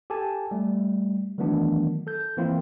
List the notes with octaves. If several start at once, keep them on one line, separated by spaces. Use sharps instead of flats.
G4 A4 G#5 A5
G3 A3
D#3 E3 F#3 A3 B3 D4
A4 G6
E3 F3 A#3 C4 E4 F4